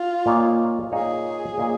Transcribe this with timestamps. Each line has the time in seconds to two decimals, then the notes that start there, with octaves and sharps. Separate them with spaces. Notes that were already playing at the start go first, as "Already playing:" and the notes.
Already playing: F4
0.26 A#2 A#3 D#4 C#5
0.92 A#2 A#3 D#4 G#4 C#5
1.58 A#2 A#3 D#4 C#5